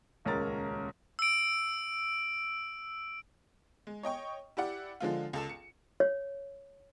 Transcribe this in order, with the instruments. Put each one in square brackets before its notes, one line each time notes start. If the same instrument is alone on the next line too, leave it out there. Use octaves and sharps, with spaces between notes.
[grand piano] D#1 C#2 C#4 A#4 A#5 A6
[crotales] E6 D7
[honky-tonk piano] G#3
C#5 D#5 G5 C#6
E4 G4 D5 F#5
D3 F3 G#3 F4
C#2 A4 E7
C#7
[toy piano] C#5